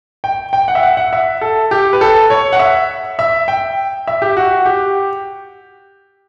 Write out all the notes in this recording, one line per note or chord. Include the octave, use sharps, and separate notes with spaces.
G5
G5
F#5
E5
F#5
F#5
E5
A4
G4
B4
A4
C#5
F#5
E5
E5
G5
E5
G4
F#4
G4